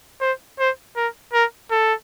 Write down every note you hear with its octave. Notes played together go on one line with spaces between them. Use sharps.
C5
C5
A#4
A#4
A4